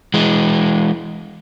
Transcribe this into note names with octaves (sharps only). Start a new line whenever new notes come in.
E3 G#3